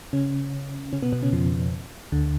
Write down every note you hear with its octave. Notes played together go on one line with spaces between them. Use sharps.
C#3 C#4
C#3 C#4
B2 B3
B2 B3
C#3 C#4
F2 F3
D2 D3